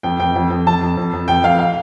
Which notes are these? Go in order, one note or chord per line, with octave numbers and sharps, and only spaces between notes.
F2 G5
F2 G5
F2
F2
F2 A5
F2
F2
F2
F2 G5
F2 F5
F5